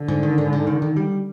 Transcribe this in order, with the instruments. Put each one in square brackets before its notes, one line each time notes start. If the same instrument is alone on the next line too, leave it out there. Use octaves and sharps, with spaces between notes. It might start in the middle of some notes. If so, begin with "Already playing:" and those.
Already playing: [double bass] D3
[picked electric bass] G#2
D#3
G#2
G#2
D#3
D#3
G3